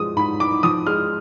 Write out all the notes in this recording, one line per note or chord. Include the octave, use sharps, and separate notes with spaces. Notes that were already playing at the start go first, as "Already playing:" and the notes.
Already playing: F3 G#3 D#6
G#2 B5
G#2 D6
F3 D#6
G#3 F6